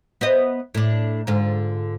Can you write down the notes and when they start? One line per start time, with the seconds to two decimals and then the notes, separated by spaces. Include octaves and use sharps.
0.21 B3 C5 D#5
0.75 A2 D4
1.27 G#2 D3 F4